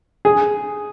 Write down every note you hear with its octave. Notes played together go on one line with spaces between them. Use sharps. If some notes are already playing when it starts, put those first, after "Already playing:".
G#4